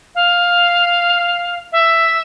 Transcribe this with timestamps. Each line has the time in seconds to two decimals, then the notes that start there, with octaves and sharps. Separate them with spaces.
0.15 F5
1.72 E5